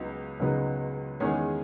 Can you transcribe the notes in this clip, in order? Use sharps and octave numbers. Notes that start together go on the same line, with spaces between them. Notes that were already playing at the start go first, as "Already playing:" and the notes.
Already playing: C#2 C#3 F#3 B3 D#4
C#2 C#3 F#3 B3 D#4
E2 D#3 G#3 C#4 G#4